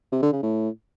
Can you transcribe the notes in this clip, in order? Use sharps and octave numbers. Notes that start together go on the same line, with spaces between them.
C3
D3
C#3
A2